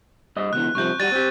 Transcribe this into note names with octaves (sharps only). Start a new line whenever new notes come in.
G2 D#5
C#2 B2 E3 F#6
C2 C3 F3 C#6 G6
G3 F#4 A6 D#7
C4 G4